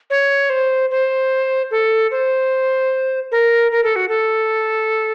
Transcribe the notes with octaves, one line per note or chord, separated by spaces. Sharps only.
C#5
C5
C5
A4
C5
A#4
A#4
A4
F#4
A4